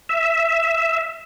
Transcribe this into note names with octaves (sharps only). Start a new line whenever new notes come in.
E5